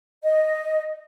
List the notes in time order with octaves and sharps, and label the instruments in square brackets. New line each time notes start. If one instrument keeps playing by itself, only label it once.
[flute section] D#5